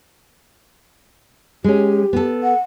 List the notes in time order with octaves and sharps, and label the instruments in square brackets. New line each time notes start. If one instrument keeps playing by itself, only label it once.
[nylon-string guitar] G#3 C#4 [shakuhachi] G4
[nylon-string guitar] B3 A4
[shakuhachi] F#5